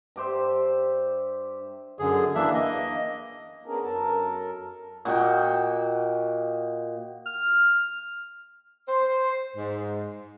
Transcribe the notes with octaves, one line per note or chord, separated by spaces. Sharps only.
G2 G4 C5 E5
F#2 D3 G#4
E3 A#3 D4 E5
A#3 D#5
B3 C#4 D4 G#4 A#4
F#2 A4 A#4
A#2 F#4 D#5 G5
F6
C5
G#2